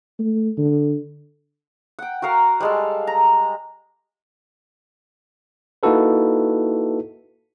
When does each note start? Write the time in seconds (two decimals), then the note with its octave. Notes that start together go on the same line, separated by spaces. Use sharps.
0.19 A3
0.57 D3
1.99 F#5 G5
2.22 F#4 A#4 F5 F#5
2.60 G3 G#3 A4
3.07 A#5
5.83 A#3 D#4 E4 F#4 A4 B4